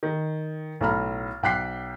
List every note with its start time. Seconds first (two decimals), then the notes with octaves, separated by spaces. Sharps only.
0.03 D#3
0.81 B1 A2 A4 A#5 B5 F6
1.43 B1 G5 D6 F#6 B6 C7